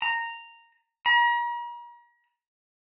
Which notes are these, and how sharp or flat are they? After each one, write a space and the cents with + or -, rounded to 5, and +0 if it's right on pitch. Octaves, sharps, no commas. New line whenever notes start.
A#5 -10
A#5 +40